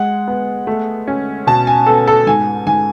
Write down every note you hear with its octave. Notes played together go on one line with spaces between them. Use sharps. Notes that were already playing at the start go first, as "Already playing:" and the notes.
Already playing: G#3 F#5
B3
A3
C#4
B2 A5
G#5
B3 A4
A4
G#2 G#5
G#2 G#5